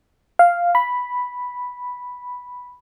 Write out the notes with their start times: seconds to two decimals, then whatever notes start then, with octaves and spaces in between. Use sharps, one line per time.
0.39 F5
0.75 B5